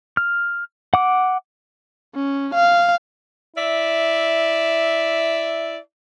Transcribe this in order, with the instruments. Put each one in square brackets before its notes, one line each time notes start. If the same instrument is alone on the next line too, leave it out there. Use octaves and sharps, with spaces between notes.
[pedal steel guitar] F6
F#5 D6
[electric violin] C#4
F5
[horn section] E4 D5 E5